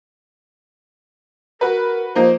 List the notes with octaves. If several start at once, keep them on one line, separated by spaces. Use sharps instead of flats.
F#4 A#4 B4
F3 A#3 D#4 C5